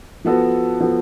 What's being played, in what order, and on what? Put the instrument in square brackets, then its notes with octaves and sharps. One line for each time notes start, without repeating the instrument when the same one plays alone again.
[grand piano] F3 B3 F#4 A4
F3 B3 F#4 A4